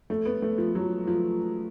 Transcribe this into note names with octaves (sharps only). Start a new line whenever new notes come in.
A3
B3
A3
F3
F#3
F3